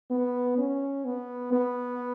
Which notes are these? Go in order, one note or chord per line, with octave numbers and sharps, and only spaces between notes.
B3
C#4
B3
B3